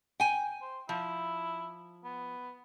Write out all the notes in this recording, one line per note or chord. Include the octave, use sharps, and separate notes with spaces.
G5 G#5
C5
F3 E4
B3